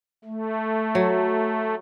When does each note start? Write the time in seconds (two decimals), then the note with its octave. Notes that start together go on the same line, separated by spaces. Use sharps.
0.25 A3
0.95 F#3